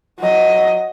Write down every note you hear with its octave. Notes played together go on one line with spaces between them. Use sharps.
F#3 D#5